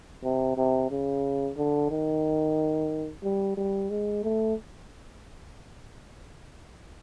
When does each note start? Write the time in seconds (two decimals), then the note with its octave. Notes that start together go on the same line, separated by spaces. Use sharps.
0.24 C3
0.57 C3
0.90 C#3
1.57 D3
1.91 D#3
3.23 G3
3.57 G3
3.90 G#3
4.24 A3